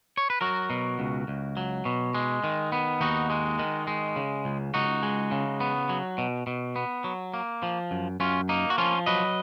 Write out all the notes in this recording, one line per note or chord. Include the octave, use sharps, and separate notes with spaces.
C#5
B4
F#3 F#4 A#4
B2
C#2
C#2
F#3
B2
G#3
D#3
B3
D#2 D#4 F#4
G#3
D#3
G#3
C#3
C#2
C#2 D#4 F#4
G#3
C#3
B3
F#3
B2
B2
B3
F#3
A#3
F3
F#2
F#2 C#4 F4
A#3 D#4
F#4
F3 C#4 F4
F#3 B4 D#5